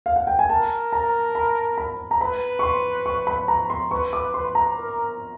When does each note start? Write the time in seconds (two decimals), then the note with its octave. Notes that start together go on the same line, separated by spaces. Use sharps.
0.06 F5
0.16 F#5
0.27 G5
0.39 G#5
0.50 A#4 A5
0.93 A#5
1.35 B5
1.78 B5
2.11 A#5
2.21 B4 B5
2.59 C#6
2.63 C6
3.06 C#6
3.27 B5
3.48 A#5
3.70 C6
3.91 B4 C#6
4.13 D6
4.34 B4 C6
4.55 A#5
4.77 A#4